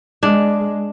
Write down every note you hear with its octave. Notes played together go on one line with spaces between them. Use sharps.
G#3 D4